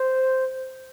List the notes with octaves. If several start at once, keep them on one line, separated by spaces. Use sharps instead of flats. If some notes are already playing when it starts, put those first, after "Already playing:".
Already playing: C5